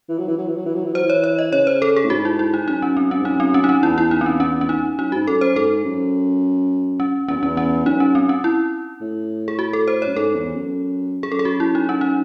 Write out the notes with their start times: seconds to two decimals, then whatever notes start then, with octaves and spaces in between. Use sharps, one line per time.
0.09 E3
0.18 F#3
0.27 E3
0.38 F#3
0.47 E3
0.56 F#3
0.65 E3
0.75 F#3
0.84 E3
0.93 F#3 C5
1.03 E3
1.10 C#5
1.24 C#5
1.39 D#5
1.52 C#3 C#5
1.67 C5
1.82 A4
1.96 G#4
2.04 A2
2.10 G#2 F#4
2.25 E4
2.39 E4
2.54 D#4
2.68 F#2 D#4
2.82 C#4
2.97 C4
3.11 C#4
3.20 G#2
3.25 F#2 D#4
3.40 C4
3.54 C#4
3.64 D#4
3.69 C#4
3.83 E2 E4
3.98 E4
4.11 D#4
4.21 C4
4.26 C#4
4.40 C#4
4.61 C#4
4.69 D#4
4.98 F#2 D#4
5.12 G#2 F#4
5.27 F#2 A4
5.41 F#2 C5
5.55 G#2 A4
5.85 F#2
7.00 C#4
7.28 E2 C#4
7.36 F#2
7.43 E2 C#4
7.57 C#4
7.86 F#2 D#4
8.00 C#4
8.15 C4
8.29 C#4
8.44 E4
9.01 A2
9.48 G#4
9.59 F#4
9.73 A4
9.88 C5
10.02 C#5
10.06 F#2
10.16 G#2 A4
10.35 E2
10.55 F#2
11.23 G#4
11.32 F#2 A4
11.39 G#4
11.45 F#4
11.60 E4
11.75 D#4
11.89 C#4
12.01 D#4